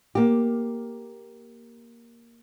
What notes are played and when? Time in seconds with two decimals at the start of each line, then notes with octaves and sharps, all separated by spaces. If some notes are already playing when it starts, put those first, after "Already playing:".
0.15 A#3 G4